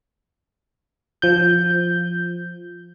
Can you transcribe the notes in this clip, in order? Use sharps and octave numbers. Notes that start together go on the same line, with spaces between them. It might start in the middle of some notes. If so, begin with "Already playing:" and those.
F3 G6